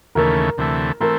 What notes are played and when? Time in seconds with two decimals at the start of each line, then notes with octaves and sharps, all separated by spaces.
0.15 D#2 C#3 E3 A3 A#4
0.58 D2 C3 E3 A3
1.00 E3 A3 C4 A#4